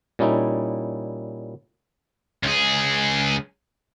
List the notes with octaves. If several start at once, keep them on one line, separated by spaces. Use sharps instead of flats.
A#2 G3 C#4 D#4 E4
C#2 G#4